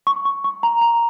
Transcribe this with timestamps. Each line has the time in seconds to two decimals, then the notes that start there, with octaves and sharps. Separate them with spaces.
0.07 C#6
0.25 C#6
0.44 C#6
0.63 A#5
0.81 A#5